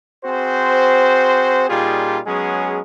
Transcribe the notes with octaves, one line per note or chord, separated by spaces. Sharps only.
C4 F#4 G#4 C5
A#2 G3 D#4 F4 G4 G#4
F#3 G#3 B3 C#4 G#4